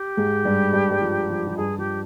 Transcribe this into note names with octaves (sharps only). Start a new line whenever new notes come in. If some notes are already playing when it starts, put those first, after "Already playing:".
Already playing: G4
G#2 G#3
G2 G3
G2 G3
G3
F3
F3
F3
G2 G3 G#4
F3 G4